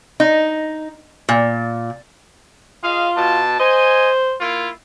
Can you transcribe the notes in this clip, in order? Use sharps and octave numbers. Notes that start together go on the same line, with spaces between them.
D#4
A#2
F4 G#4 D#5 F5
B2 A5
C5 D#5 G#5
A#3 E4 F4